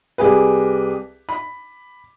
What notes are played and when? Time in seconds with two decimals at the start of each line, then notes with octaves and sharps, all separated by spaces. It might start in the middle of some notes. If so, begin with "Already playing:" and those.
0.18 C2 G4 G#4 B4
1.29 B5